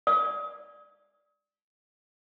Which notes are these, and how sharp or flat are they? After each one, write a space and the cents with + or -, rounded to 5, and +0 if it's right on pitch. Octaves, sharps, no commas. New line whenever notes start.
D5 +0 D#6 +40